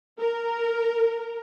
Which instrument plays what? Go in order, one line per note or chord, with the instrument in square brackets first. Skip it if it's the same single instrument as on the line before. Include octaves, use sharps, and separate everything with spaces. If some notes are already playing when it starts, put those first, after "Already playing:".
[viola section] A#4